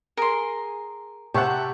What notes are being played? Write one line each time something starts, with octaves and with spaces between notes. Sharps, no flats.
G#4 A#4 C6
C3 G4 E5 F#5 A5 C#6